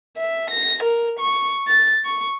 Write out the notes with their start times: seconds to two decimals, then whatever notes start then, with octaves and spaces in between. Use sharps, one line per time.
0.17 E5
0.51 A#6
0.83 A#4
1.20 C#6
1.68 A6
2.05 C#6